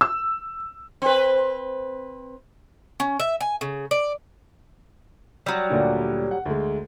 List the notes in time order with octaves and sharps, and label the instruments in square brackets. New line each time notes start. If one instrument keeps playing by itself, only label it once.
[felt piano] E6
[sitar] C4 B4
[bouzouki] C#4
E5
G#5
C#3
D5
F#3 G3
[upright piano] D2 A#2 D4
F#5
D2 G#3